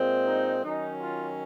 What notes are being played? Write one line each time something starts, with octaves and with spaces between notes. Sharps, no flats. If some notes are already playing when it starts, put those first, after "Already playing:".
Already playing: A#2 G#3 C4
D#4
D#3 F#3 C#4 D#4
F4